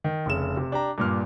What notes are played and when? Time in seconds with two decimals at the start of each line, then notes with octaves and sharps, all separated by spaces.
0.04 D#3
0.26 F1 C#3 E7
0.57 C3
0.72 D4 G4 A#5
0.98 G2 A#2 F6